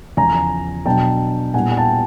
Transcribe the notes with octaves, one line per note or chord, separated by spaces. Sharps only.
E2 C#3 F3 G#5 A#5
B2 F#3 B3 D4 G5 A5
A#2 G3 B3 E4 F#5 G#5
G#5
G5 A5